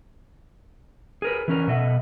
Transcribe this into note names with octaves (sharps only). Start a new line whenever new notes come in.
G#4 A#4 B4
E3 C#4 A#4
B2 A4 D#5 E5 F#5